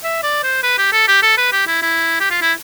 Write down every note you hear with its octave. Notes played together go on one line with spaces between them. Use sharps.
E5
D5
C5
B4
G4
A4
G4
A4
B4
G4
E4
E4
G4
F4
E4